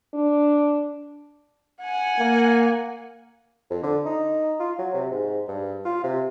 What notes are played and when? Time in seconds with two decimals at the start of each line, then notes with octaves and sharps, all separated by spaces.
0.14 D4
1.81 F#5 G#5
2.19 A#3
3.71 F2
3.83 D3
4.06 D#4
4.60 F4
4.79 F#3
4.94 C3
5.11 G#2
5.48 G2
5.85 F4
6.04 C3